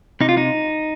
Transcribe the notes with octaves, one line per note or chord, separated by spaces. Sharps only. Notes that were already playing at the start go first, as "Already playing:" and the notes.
C3 D#4
F4
D#4